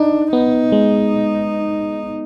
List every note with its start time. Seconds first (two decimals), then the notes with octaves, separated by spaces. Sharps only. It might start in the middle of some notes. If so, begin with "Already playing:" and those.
Already playing: D4 D#4
0.32 B3 D#4
0.72 G#3